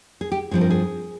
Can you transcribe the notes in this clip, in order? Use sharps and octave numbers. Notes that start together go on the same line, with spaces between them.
G#4
G4
G2 F3 C4 G#4
A#4
G#4